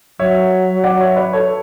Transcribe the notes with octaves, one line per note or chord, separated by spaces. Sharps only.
F#3 C#5 E5
D5 F#5
C#5 E5
B4 D5
A4 C#5